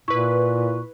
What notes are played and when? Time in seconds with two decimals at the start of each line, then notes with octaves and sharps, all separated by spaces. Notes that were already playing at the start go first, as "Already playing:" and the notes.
0.08 A#2 E4 B4 C#6